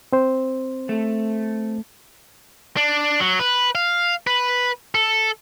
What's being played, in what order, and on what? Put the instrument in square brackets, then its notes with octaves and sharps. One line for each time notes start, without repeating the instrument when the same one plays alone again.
[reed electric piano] C4 C5
[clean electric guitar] A3
[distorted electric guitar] D4
F#3
B4
F5
B4
A4